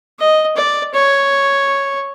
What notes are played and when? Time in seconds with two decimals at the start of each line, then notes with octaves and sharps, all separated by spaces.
0.19 D#5
0.56 D5
0.94 C#5